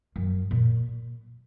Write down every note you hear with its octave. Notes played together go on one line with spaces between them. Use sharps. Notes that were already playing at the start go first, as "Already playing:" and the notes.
F#2
A#2